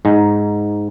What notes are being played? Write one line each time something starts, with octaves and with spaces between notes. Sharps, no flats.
G#2 D#4